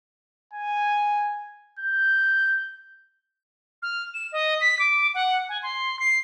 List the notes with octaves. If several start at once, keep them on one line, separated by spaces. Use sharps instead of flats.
G#5
G6
F6
E7
D#5
B6
D6
F#5
G#5
C6
C7